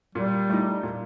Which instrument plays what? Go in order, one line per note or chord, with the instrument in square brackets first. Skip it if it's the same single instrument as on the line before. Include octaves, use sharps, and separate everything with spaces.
[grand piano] A#2 [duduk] G3
[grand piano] A3 D#4
A#2